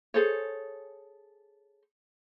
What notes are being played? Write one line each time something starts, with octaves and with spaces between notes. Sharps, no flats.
G#4 A4 C5 C#5